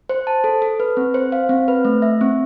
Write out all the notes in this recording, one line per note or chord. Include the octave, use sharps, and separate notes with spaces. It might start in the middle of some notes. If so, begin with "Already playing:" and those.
C5
A5
A4
A4
B4
C4
C5
F5
C4
B4
A3
E5
C4